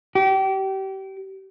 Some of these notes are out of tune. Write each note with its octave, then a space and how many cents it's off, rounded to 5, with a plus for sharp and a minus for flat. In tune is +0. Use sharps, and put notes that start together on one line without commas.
G4 -30